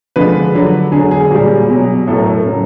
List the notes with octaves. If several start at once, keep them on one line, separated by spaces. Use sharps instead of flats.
D3 F3 G#3 B4
D3 F#3
D3 F#3 G#4
G#4
A#2 G3 G#4
B2 F#3
A2 F#3 A4
A#4
A4
C#3 F#3